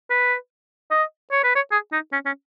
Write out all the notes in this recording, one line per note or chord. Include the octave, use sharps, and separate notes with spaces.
B4
D#5
C#5
B4
C#5
G#4
D#4
C#4
C#4